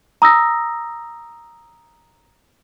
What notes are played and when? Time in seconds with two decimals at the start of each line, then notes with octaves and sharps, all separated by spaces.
0.22 A#5 D#6 E6 A#6